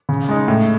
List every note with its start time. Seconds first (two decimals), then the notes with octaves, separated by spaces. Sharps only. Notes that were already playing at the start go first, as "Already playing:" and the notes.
0.09 C#3
0.28 G#3 D#4
0.48 A2